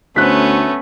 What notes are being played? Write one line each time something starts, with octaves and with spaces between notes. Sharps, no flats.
D2 A3 B3 C#4 C5 F#6 B6